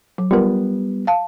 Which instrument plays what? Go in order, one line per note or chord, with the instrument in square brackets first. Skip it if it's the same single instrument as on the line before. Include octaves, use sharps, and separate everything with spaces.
[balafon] F#3
[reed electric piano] G3 B3 [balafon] F4 A#4
[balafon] F5 A5